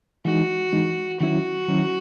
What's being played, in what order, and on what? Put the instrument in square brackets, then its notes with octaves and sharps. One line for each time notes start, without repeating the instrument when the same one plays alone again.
[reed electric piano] E3 G#3 D#4 [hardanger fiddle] F#4
[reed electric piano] E3 G#3 D#4
[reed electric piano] D#3 F#3 C#4 E4 [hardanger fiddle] F#4
[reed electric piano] D#3 F#3 C#4 E4